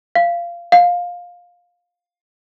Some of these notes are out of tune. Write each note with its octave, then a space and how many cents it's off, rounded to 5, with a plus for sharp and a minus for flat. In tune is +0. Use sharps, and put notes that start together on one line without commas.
F5 -20
F5 +15